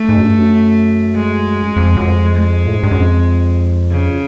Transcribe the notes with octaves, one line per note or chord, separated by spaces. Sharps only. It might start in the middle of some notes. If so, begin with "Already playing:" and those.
Already playing: A3
G#2
F#2
G2
F#2
G#3
F2
F#2
F2
G#3
A2
G#2
G2
F#2
F2
C#3